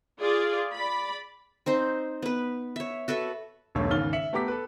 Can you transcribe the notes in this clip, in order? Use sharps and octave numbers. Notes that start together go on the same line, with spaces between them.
F4 G#4 D5
D5 B5
C4 D#4 C5
B3 B4
C#5 E5
F#4 A4 B4 E5
E1 B1 G2 A3 C#5
D#2 G#2 C#3 F6 A6 G7
E5 C#7 F#7
A3 B3 G4 A#5 D6 B6
A4 B4